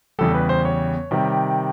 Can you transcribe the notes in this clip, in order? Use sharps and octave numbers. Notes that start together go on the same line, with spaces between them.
E2 C#3 E3 G3 A4
B4
C5
C#5
C3 D#3 G3